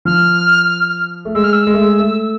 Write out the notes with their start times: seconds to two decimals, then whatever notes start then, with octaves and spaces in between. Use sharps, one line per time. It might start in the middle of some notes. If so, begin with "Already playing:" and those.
0.05 F3 F6
1.25 A3
1.34 G#3 E6
1.43 F6
1.52 E6
1.67 G#3
1.74 A3
1.81 G#3
1.99 A3